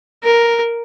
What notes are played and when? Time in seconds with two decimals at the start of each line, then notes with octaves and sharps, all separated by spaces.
0.24 A#4